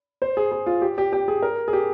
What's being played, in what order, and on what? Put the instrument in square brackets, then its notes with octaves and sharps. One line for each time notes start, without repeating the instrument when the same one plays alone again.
[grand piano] C5
G#4
G#4
F4
G4
G4
G4
G#4
A#4
G#4
G4